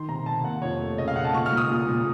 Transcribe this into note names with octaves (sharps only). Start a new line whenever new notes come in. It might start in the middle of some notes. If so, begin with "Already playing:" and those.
Already playing: D#3 C6
C3 A#5
C3 A5
A#3 F#5
F2 C#5
A3
C#3 D#5
F5
C#3 F#5
A5
A#2 C#6
F6
A#2
D#6
A#2
A#2